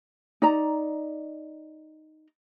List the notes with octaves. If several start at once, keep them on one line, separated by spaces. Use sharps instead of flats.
D#4 D5 A#5